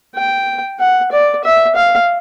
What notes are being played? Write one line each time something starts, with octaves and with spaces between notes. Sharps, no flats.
G5
F#5
D5
E5
F5